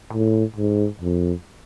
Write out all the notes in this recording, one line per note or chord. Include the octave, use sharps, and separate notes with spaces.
A2
G#2
F2